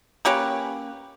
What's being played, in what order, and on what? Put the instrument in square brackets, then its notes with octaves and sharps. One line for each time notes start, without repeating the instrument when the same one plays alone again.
[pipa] A#3 C#4 G4 B4